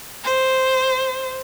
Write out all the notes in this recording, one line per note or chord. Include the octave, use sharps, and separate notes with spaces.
C5